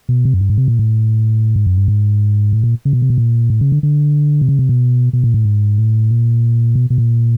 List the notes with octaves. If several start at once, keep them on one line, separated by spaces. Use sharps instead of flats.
B2
C3
F#2
G2
G#2
C3
A#2
A2
G#2
F#2
G2
G#2
A2
A#2
C#3
B2
C3
B2
A#2
A2
C#3
D3
D3
C3
C#3
C3
B2
B2
A#2
A2
G#2
A2
A#2
B2
B2
A#2